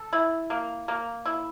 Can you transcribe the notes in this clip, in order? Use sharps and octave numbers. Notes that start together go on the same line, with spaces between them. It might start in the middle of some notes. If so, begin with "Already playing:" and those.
Already playing: A4
E4
A#3
A#3
E4